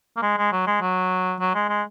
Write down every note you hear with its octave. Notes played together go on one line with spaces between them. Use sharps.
A#3
G#3
G#3
F#3
G#3
F#3
F#3
G#3
G#3